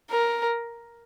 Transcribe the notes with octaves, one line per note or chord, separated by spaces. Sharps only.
A#4